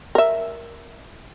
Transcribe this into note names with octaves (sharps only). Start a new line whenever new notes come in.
A#4 E5